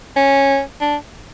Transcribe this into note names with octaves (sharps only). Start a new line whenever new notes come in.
C#4
D4